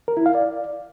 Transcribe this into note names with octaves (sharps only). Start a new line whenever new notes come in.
A#4
E4
F5
D5